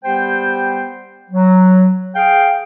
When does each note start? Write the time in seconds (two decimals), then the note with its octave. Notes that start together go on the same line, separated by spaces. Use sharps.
0.04 G3 B3 G4 C5 G5
1.30 F#3
2.15 G#4 F5 G5